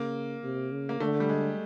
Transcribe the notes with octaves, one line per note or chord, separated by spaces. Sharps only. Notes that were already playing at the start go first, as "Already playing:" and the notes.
Already playing: C#3 A#3
C3
C#3
A#3
D3 A3
G3
G#3